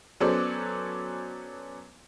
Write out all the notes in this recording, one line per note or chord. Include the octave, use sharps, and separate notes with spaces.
F#3 B3 C#4 A4 C5 D5